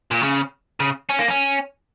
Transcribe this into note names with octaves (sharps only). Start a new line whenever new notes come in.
A#2
C#3
C#3
C#4
A#3
C#4